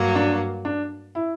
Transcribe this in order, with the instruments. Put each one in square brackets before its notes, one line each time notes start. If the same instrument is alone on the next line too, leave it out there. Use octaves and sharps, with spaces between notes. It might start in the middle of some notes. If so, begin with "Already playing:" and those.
Already playing: [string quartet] G2 F#3 A#3
[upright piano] D4
D4
E4